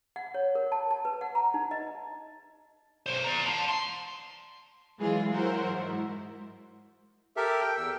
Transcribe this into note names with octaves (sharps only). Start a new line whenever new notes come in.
F#5
C#5
A#4
A5
A5
B4
F#5
A#5
D#4
D#5
B1 C5
D5 A#5
A5 C6
C6
E3 F#3 G#3 E4 F4 G#4
F#3 E4 F#4 A#4 C5
G#2 E4
G4 A4 A#4 E5
G5
E2 E6